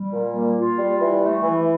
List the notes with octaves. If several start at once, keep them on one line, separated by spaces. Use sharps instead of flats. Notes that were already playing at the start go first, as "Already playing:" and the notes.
Already playing: G3
A#2
A#3
F4
G3
E3
A3
E3